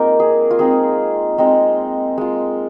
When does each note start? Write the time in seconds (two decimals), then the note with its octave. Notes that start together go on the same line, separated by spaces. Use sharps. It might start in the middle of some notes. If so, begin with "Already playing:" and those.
Already playing: G#3 A#3 C4 D#4 F4 A#4 D#5
0.20 G#4
0.51 F4
0.59 G#3 C4 D#4 G#4
1.38 G#3 C4 D#4
2.18 G#3 F4